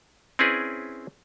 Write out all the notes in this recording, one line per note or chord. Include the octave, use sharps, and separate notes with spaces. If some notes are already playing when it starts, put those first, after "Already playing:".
C4 C#4 E4 G#4 B4 D5